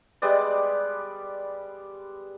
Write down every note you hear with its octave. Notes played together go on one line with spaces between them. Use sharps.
G3 G#3 B3 D5